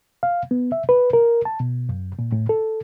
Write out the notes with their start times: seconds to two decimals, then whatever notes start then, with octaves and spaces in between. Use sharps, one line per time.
0.23 F5
0.51 B3
0.72 E5
0.89 B4
1.13 A#4
1.45 A5
1.60 B2
1.89 F#2
2.19 A#2
2.32 A2
2.49 A4